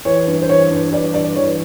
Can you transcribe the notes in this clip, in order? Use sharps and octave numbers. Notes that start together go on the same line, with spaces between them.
E3 C#5
G2
C5
E3 C#5
G2
E3 D5
G2 D5
E3 C#5